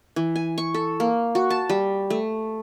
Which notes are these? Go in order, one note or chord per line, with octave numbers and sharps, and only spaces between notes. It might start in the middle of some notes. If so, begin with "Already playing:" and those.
E3
G#5
C#6
A4
A#3
F#4
A5
G3
A3